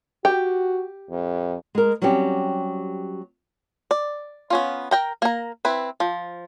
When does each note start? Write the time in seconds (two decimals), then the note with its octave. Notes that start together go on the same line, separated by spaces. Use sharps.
0.25 F#4 G4
1.10 F2
1.75 G#3 A#4
2.02 F#3 G3 C4 C#4 G4
3.91 D5
4.50 B3 C#4 F4
4.91 A#4 G5 A#5
5.22 A#3 A#5
5.65 C4 E4 B4
6.00 F3